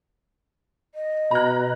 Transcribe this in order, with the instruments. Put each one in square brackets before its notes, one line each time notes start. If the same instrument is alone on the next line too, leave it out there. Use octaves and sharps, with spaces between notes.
[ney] D#5
[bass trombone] B2 [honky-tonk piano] A#5 F#6